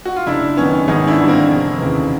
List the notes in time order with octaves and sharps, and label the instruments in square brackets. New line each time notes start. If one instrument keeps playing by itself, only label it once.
[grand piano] F#4
F4
[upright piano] F#1 [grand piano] D4 E4
[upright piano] F#2 D#3 [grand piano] B3 C#4
[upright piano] G#1 [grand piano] C#4 D#4
[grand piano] D4 E4
[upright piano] G2 D3 G3
[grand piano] A#3 C4
[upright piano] F1
D#2 C#3 E3